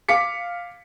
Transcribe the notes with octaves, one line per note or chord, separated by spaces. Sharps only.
F5 D6 B6 C#7